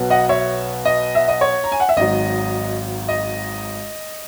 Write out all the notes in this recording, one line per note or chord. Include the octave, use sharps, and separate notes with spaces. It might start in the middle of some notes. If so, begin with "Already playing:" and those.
Already playing: B1 B2 F#3 B3
D#5 F#5
C#5 E5
D#5
E5
D#5
C#5
A#5
G#5
F#5
E5
G#1 G#2 F#3 D#5
D#5